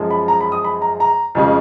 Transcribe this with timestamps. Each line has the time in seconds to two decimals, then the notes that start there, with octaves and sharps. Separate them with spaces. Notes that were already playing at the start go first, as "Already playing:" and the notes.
Already playing: F#2 F3 G#3
0.11 B5
0.28 A#5
0.41 B5
0.52 D#6
0.65 B5
0.82 A#5
1.00 A#5
1.35 F2 C#3 G#3